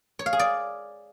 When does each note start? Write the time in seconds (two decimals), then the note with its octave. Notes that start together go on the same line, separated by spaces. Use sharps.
0.19 C#5
0.26 F5
0.33 G#4
0.39 D5